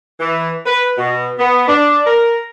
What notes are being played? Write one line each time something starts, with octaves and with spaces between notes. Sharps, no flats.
E3
B4
B2
B3
D4
A#4